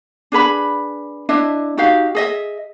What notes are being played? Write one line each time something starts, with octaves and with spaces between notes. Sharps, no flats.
D4 G#4 B4 B5
D4 E4 D#5 E5
D#4 F#4 G4 F5
G#4 D#5 E5